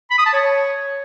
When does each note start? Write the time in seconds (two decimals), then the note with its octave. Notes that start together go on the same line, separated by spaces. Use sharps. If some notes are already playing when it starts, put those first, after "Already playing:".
0.10 B5
0.18 D#6
0.26 A5
0.33 C#5